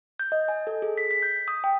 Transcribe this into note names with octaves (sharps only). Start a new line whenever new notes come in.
G6
D#5
G#5
A4
G#4
B6
B6
G6
D#6
G5